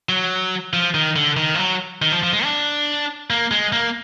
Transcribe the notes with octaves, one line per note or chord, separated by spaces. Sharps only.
F#3
F3
D#3
D3
D#3
F3
F#3
D#3
F3
F3
G#3
D4
A#3
G#3
A#3